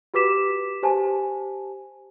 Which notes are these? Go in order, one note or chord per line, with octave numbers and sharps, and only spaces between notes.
F#4 G4 B4 D6 B6 E7
G4 C5 G#5 A5